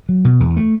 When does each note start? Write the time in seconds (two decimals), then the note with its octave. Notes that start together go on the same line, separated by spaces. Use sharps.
0.09 F#3
0.25 B2
0.40 E2
0.56 A3